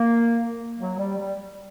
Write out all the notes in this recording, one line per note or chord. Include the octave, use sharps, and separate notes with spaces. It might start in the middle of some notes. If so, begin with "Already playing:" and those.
Already playing: A#3
F#3
G3
G3